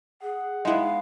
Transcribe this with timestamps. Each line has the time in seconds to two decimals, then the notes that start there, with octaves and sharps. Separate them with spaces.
0.22 G#4 F#5
0.65 G#3 B3 D#4 E4 F5